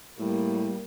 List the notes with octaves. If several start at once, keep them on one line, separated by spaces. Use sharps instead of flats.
A2 G3 A#3